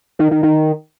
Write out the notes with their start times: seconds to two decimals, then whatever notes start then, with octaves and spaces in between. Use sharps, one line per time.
0.19 D#3
0.31 D#3
0.43 D#3